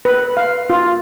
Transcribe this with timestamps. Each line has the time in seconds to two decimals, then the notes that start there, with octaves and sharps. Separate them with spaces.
0.05 B4
0.37 F5
0.70 F4